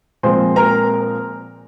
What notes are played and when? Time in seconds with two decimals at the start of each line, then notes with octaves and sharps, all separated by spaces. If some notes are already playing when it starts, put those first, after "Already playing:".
0.23 A#2 F3 G#3 C4 C5 C6
0.56 A#4 A#5